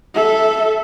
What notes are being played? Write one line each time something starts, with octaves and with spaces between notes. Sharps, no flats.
A4 E5